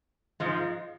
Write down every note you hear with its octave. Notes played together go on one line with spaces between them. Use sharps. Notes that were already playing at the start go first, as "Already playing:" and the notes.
G#2 F3 G#3